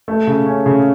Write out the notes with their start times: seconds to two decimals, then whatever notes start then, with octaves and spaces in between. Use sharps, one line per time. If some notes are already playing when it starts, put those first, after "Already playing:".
0.08 A3
0.27 C#3
0.46 C#4
0.66 C#3